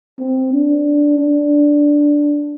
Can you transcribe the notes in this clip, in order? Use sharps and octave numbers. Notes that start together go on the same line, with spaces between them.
C4
D4
D4